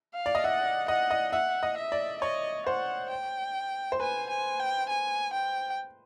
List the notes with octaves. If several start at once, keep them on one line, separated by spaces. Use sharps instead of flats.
F5
D5
D#5
E5 F#5
D#5 F#5
D#5
E5 F#5
D#5
E5
D5
C#5 D#5
C5 F#5
G5
C5
B4 G#5
G#5
G5
G#5
G5